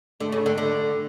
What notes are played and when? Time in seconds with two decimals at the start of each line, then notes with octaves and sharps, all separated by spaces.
0.20 D3 A3
0.32 C#3
0.46 D3
0.58 D3 A3